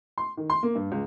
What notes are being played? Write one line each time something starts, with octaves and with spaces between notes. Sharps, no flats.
C6
D#3
C6
A#3
G2
C#2